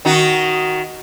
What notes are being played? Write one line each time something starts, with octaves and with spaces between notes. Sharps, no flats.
D#3 D#4 F#4